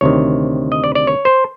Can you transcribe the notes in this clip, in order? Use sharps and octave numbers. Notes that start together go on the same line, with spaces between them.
D2 C3 D#3 C#5
D#5
D5
D5
C#5
C5